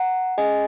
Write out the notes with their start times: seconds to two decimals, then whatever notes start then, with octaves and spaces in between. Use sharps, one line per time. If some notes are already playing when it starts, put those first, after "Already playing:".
Already playing: F#5 A#5
0.38 C#4 G#4 D#5 G#5